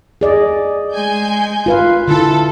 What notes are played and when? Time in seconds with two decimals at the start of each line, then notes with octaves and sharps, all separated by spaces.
0.21 G#4 D5 D#5
0.93 G#3 G#5 G6
1.66 F4 B4 F5
2.08 D3 E4 A4